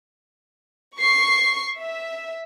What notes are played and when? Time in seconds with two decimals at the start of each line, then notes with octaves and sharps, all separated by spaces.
0.98 C#6 C7
1.79 E5